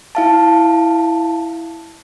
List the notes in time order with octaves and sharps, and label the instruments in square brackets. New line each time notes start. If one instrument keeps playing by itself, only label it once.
[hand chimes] E4 F5 A5